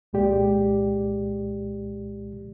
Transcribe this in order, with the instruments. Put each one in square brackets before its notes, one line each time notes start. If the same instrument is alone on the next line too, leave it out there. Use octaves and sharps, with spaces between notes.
[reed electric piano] C2 A#2 G#3 G4 D5